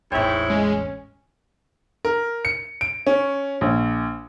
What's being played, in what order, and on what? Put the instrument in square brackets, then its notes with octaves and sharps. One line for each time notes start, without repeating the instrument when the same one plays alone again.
[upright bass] A1 E2 [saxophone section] G#2 E4 C#5 [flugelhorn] G5
[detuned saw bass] G#3 [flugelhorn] C#4
[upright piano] A#4
C#7
D7
C#4
A#1